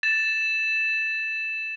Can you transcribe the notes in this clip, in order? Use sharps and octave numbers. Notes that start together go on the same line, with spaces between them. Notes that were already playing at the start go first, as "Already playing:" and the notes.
A6 E7